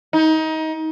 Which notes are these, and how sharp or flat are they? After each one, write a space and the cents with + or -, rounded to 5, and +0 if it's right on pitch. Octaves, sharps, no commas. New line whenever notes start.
D#4 +25